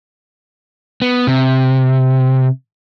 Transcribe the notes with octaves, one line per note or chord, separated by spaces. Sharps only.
B3
C3